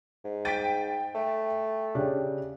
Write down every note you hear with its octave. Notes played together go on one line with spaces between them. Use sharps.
G#2
G5 A6 B6 D7 D#7
A3
C#3 D4 G4